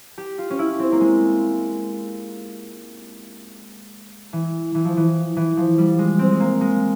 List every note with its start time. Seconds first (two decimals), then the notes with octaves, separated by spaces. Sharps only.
0.18 G4
0.38 F4
0.50 C#4
0.59 E4
0.79 C4
0.92 A#3
1.01 G#3
4.33 E3
4.75 E3
4.85 F3
4.97 E3
5.37 E3
5.57 F3
5.78 G3
5.99 G#3
6.19 C4
6.31 G#3
6.40 A#3
6.61 G#3